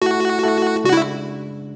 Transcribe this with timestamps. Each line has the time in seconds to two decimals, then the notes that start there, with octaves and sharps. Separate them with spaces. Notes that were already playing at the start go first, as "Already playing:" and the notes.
0.02 A3 E4 F#4 A4
0.43 A3 E4 A4
0.84 C#3 G#3 D4 F#4
0.93 E4